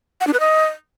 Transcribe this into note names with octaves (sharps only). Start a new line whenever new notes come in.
F#5
D4
B4
D#5